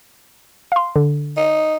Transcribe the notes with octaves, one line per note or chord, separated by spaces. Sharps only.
F5 C6
D3
D#4